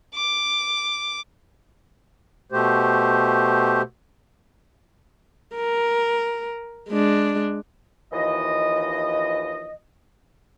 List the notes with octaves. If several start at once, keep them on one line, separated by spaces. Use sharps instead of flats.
D6
B2 A3 G4 C5
A#4
G#3 D4
D#2 E3 F3 D#5